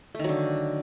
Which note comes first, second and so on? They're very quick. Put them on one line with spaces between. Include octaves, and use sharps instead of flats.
A3 D#3 F#3 D3